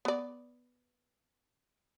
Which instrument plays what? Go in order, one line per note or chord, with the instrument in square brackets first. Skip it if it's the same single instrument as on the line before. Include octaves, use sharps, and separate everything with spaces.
[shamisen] B3 D5